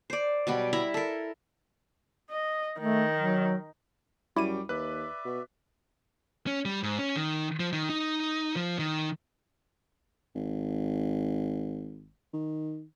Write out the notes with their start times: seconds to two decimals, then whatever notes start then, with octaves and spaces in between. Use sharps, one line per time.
0.10 C5 D5
0.47 B2 F#3 G3 B3
0.73 E4 E5 A#5 B5
0.94 A4 A#4
2.30 D#5
2.80 D#3 A3
3.17 F#3
4.36 F#2 G3 E4 D6 D#7
4.69 D#2 B4 D5 E5 F#6
5.25 B2
6.47 C#4
6.65 G3
6.83 G#2
6.99 C#4
7.16 D#3
7.60 F3
7.73 D#3
7.89 D#4
8.56 F3
8.79 D#3
10.35 G#1
12.33 D#3